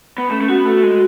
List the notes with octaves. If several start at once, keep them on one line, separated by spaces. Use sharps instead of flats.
B3
A3 C#4
A3
B3 F#4
A3 A4
G#3 F#4